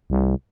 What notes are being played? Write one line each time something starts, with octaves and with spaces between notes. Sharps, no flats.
C2